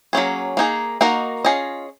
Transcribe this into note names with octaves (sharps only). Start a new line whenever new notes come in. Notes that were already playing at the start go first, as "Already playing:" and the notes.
F#3 A#3 C#4 G#4
A#3 D#4 G#4
A#3 D#4 F#4 A#4 D#5
C#4 F4 G#4 D#5